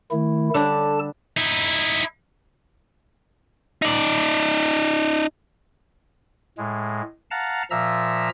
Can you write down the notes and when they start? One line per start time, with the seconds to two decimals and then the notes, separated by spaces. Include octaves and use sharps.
0.11 D#3 A3 E4
0.54 D3 G3 D4 A4 A5
1.37 D#4 E4
3.82 D#4 D5
6.58 A2 G#3
7.31 F5 F#5 A5 A#5
7.71 A#2 F3 E5 A#5 E6